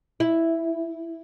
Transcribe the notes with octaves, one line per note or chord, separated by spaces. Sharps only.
E4